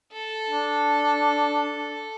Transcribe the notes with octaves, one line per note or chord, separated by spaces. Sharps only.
A4
D4